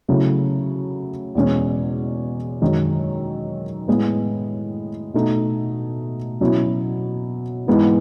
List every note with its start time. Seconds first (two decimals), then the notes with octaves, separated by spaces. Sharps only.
0.08 C#3 F#3 A3 E4
1.35 E2 B2 G#3 C#4
2.62 F#2 D#3 G#3
3.88 A2 G#3 B3
5.14 B2 A3 D#4
6.41 B2 F#3 C#4 E4
7.67 G#2 E3 G#3 B3 E4